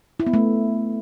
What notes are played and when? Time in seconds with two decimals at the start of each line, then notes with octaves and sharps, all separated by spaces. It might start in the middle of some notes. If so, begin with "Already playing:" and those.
0.20 E4
0.27 B3
0.33 A3